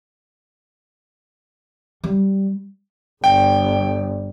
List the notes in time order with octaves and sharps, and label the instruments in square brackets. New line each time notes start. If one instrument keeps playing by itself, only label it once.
[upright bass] G3
[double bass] G1 [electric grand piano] G5